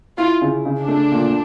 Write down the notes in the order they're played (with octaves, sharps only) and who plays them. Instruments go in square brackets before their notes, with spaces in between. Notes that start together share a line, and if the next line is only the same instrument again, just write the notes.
[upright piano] E4 [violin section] F4
[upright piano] C#3
C#3
[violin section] D4
[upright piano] A3
A#2